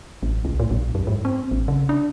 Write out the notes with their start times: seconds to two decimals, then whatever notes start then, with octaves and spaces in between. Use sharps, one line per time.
0.23 A1
0.45 C2
0.60 A2
0.71 A#1
0.95 F#2
1.07 G#2
1.25 C4
1.51 A1
1.68 C#3
1.89 D4